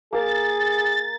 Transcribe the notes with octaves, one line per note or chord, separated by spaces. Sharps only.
A#3 G#4 A#4 A6